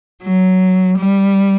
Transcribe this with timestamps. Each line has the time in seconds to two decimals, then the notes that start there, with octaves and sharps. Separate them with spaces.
0.23 F#3
0.98 G3